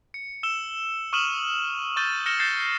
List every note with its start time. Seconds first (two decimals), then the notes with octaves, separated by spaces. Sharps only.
0.14 C#7
0.43 E6 E7 G7
1.13 C#6 D#6 F6 D#7 E7 F#7
1.96 C#6 E6 G6 A6 D#7 G7
2.26 F6 A#6 C#7 E7 G7
2.39 G6 A6 A#6 C7 E7